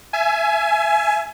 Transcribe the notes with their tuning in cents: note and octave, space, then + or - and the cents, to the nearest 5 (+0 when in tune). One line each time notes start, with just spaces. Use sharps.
E5 +25 G#5 +20